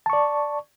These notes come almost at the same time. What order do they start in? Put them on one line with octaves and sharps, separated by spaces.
A5 C#6 D5